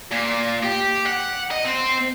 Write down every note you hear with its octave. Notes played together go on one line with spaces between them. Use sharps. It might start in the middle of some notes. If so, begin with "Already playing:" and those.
A#2
G4
F#5
D#5
C4